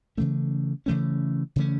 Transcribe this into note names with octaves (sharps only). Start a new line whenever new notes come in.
C#3 E3 A3 C#4
C#3 E3 A3 C#4
C#3 E3 A3 C#4